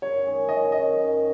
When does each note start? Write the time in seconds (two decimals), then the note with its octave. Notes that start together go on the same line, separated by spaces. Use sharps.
0.02 F#2 C#5
0.26 D#3 G#3 C#4
0.49 F#2 D#5
0.72 D#3 G#3 C#4 D#5
0.95 F#2
1.18 D#3